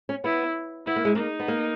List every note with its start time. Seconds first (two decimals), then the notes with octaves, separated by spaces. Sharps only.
0.09 C#4
0.24 B3 E4
0.86 B3 E4
0.96 A#3
1.05 G#3
1.15 A#3 D#4
1.40 B3
1.48 A#3